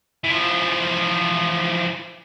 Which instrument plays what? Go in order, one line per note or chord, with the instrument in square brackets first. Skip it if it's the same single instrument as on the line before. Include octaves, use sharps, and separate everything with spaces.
[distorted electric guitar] E3 F3